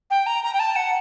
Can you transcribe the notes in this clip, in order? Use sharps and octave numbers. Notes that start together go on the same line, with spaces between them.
G5
A#5
A#5
G5
A5
F#5